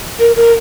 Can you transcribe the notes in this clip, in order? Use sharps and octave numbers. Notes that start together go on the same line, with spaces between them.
A#4
A#4